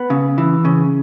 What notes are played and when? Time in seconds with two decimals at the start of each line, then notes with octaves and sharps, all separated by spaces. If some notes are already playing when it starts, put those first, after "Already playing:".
Already playing: B3
0.10 C#3
0.38 E3
0.65 C#3